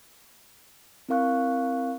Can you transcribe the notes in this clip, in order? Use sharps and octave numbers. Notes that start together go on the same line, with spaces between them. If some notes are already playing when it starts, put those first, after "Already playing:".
C4 E4 A#4 F5 C#6 F#6